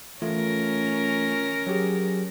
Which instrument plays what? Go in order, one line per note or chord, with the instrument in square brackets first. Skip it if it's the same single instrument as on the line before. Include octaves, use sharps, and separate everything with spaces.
[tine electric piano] E3 A3 F4 [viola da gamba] C#4 A#4
[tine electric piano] F#3 G4 G#4